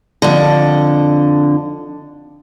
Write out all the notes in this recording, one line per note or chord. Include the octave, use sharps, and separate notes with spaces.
F2 D3